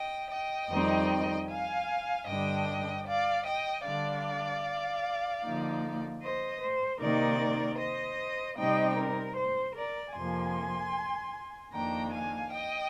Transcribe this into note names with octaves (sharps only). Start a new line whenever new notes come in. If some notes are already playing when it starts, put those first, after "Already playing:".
Already playing: D#5 G5
D#5 G5
F2 D#3 G3 C4 D#4
F5 G#5
G2 D3 G3 D4 D#5 G5
D5 F5
D#5 G5
D3 G3 D4 D5 F5
D3 F3 A#3 D#4
C5 D#5
C5
C3 D#3 A#3 D#4 A#4 D5
C5 D#5
C3 G3 C4 D#4 D#5 G5
A#4
C5
A#4 D5
F2 C3 F3 A#3 G#5 C6
F2 D#3 A#3 D4 G5 A#5
F5 G#5
D#5 G5